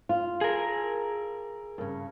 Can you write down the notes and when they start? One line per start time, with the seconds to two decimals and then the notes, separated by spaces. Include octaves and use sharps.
0.09 F4
0.41 G#4 A#4
1.78 G2 C#3